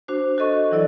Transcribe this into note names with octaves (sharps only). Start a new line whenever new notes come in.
D4 F#4 C5
F#4 A4 D#5 C#6
E3 F#3 E4 A4 D5